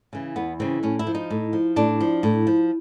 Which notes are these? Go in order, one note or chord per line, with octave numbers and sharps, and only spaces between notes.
C#3 E3
E2 B3
C#3 E3 C4
A2 C#4
E4
F3
D#4
A2
F3
A2 D4
F3
A2
F3